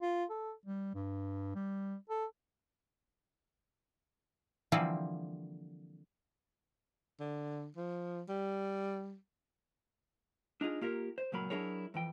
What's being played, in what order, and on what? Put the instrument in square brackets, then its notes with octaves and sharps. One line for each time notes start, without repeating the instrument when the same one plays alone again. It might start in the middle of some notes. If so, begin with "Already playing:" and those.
[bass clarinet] F4
A4
G3
G2
G3
A4
[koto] D3 E3 F3 G3 A#3 C4
[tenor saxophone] D3
F3
G3
[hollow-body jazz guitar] D4 D#4 F4 G4 G#4
A#3 F4 G4 A#4
C5
C#2 A#2 F#3 A#4 B5
F#3 D4 E4 G#4 A#4 C#5
F2 E3 G5